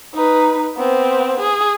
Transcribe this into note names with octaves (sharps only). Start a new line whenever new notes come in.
D#4 B4
B3 C4
G#4